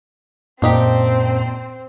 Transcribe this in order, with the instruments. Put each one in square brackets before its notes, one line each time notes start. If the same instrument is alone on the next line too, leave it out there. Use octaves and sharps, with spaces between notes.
[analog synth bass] F#2 [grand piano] A#2 [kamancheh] C4 C5 [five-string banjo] D4 D#4 G4